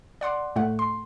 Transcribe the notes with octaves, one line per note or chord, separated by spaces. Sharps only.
D5 F#5 C6 D6
A2 A3 F#5
C6